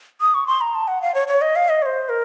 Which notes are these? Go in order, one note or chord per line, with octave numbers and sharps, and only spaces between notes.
D#6
C#6
C6
A#5
A5
F#5
F5
C#5
C#5
D#5
F5
D#5
C#5
C5
A#4